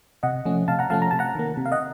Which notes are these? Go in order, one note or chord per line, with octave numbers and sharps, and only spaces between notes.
C3 D#5 F#5
F3 A3 C#4
C3 F5 A5
F#5 A#5
F3 A3 C#4 F5 A5
A#5
C3 A5
F#5 A#5
D#3 A#3
C3
F5
D#5 F#5